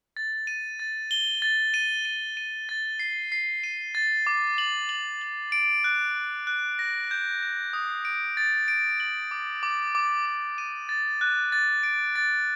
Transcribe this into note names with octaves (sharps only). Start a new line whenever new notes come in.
A6
D#7
A6
G7
A6
D#7
D#7
D#7
A6
C7
C7
D#7
A6
D6
F#7
F#7
F#7
D7
F#6
F#6
F#6
A#6
G6
G6
D#6
D7
A6
D7
F#7
D6
D6
D6
D6
D#7
A6
F#6
A6
D7
A6